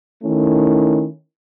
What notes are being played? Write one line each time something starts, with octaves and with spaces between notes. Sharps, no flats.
D#3 A3 C#4 E4